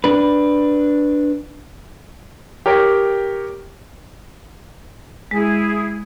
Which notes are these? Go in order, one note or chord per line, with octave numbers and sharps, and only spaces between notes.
D4 B4
G4 A#4 C#5 G5
G#3 E4 G#4